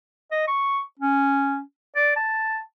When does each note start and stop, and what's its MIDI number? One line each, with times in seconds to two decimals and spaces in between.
0.31 0.47 75
0.47 0.80 85
0.99 1.60 61
1.96 2.12 74
2.16 2.60 81